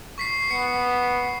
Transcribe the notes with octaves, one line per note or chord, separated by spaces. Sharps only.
C#6 B6 C7
B3 C#7